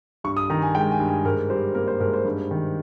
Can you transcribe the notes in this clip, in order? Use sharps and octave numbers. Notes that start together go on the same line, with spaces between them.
G2 C#6
D#6
D#3 A#5
G#5
G#3 G5
G#5
G2
G#5
G#2 A#4
G3 C5
A#3 A#4
C5
G#2 A#4
C5
G2
D#3